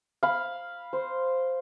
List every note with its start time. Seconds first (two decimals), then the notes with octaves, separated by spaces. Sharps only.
0.23 F5 B5
0.93 C5